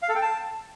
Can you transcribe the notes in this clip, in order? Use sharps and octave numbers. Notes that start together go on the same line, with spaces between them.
F5
A4
G5
A5